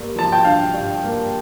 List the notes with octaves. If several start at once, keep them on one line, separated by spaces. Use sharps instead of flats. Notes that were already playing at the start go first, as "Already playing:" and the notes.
Already playing: G2 A#3
F3 A5
G5
D4 F5
G2
A#3